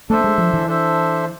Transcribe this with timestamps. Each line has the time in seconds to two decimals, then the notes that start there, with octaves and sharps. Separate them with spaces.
0.09 A3 D4 A4 C5 E5
0.24 G#3
0.38 F3
0.53 E3
0.67 D4 A4 C5 E5